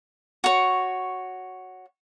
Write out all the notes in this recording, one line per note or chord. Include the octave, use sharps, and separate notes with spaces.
F#4 C#5